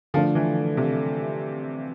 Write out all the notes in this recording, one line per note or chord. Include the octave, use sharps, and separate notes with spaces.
D3 F3 A3 D4 F4
E3
C3